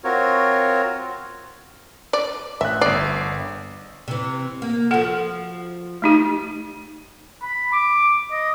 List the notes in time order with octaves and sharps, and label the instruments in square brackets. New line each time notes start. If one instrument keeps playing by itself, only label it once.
[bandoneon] C4 F4 F#4 A#4 C#5
[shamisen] D5
[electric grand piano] A1 F#6 [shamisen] E5
[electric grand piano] G1 C7 [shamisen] D5
[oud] C3 E3
A#3
[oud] F3 F#4 [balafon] A4 F#5
[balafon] A3 D#4 G4
[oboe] B5
D6
D#5